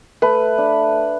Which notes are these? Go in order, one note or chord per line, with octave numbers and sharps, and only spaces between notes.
A3 B4
D4